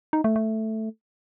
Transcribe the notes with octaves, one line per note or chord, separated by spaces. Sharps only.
D#4
A3
A3